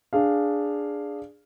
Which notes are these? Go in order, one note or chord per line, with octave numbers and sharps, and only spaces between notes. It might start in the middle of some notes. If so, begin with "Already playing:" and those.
D4 G#4 F5